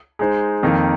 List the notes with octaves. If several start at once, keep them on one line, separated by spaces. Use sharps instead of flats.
G#3 D#4 G#4 C5
F2 D#3 A#3 D#4